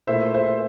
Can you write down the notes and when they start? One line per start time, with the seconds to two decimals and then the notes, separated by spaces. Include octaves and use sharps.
0.07 A#2 A3 E4 C5 E5
0.34 C5 E5